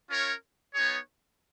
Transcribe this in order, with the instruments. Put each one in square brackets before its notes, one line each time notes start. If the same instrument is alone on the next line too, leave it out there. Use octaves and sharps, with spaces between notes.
[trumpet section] C#4 F4 A#4 C#5
B3 D#4 G#4 C#5